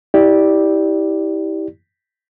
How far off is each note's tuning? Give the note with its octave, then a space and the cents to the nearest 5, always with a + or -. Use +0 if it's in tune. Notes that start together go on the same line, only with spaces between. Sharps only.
E4 -30 G4 +0 D5 +0